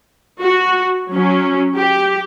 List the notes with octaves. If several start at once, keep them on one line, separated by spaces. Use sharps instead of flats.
F#4
F#3 C#4
G4